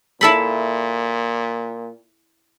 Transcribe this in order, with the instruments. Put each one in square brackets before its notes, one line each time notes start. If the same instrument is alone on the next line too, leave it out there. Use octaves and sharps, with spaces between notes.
[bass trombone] A#2 [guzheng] E4 A4 B5